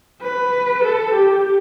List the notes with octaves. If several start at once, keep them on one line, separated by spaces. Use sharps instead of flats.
B4
A4
G4